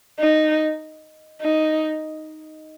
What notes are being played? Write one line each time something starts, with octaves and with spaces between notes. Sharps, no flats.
D#4
D#4